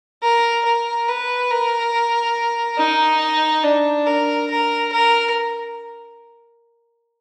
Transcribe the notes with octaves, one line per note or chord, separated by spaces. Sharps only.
A#4
A#4
B4
A#4
D#4
D4
A#4
A#4
A#4